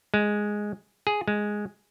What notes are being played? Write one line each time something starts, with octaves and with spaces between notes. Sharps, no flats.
G#3
G#4
G#3